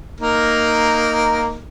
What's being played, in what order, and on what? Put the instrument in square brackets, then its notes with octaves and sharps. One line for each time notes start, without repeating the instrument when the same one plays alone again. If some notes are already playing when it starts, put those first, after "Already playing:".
[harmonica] A#3 D#4 A#4